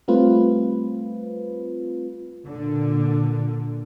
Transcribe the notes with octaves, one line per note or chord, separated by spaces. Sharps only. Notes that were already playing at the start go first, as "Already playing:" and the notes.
G3 A3 C4 F4 B4
A#2 D3